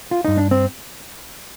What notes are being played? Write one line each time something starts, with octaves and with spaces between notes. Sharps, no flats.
F4
G2 D#4
D4
C4